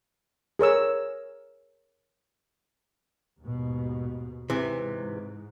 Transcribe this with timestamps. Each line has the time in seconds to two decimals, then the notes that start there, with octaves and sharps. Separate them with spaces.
0.59 G#4 A#4 C#5 E6
3.41 D#2 G#2 B2
4.50 G#2 C3 E3